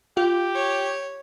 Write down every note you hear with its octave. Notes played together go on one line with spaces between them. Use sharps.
F4 G4
C#5